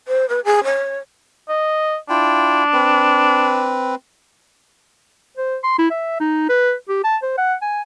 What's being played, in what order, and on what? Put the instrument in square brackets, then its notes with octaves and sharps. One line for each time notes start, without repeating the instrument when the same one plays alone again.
[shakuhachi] C5
B4
G#4
C#5
[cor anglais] D#5
[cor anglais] D4 [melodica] E4 F4 G5
[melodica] C4 B4
[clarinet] C5
C6
E4
E5
D#4
B4
G4
A5
C5
F#5
G#5